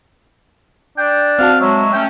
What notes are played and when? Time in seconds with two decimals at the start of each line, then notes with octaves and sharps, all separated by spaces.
0.98 D4 G5
1.39 C4 F#4 F5 A5
1.61 F#3 G#3 C#5 E5
1.93 A3 C#4 G5